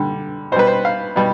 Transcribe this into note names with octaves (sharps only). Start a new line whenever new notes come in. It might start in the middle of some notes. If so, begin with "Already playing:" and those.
Already playing: D3 G3
B2 G3 B4 C5
C5
F5
B2 G3